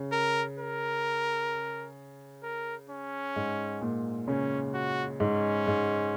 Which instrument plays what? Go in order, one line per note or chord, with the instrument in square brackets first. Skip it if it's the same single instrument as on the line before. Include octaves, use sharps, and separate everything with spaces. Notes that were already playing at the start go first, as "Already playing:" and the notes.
Already playing: [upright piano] C#3
[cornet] A#4
A#4
A#4
C#4
[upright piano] G#2
A#2
[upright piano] C#3 [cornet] C#4
[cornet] F#4
[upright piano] G#2 [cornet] C#4
[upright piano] G#2